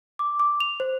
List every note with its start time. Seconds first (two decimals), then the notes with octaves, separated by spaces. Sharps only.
0.19 D6
0.39 D6
0.60 F7
0.80 C5